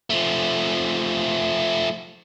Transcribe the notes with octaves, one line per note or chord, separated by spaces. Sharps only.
F3 A3